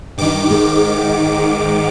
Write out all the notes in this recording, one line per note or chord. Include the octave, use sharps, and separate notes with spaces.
G2 D#3 D6
G#2 D#3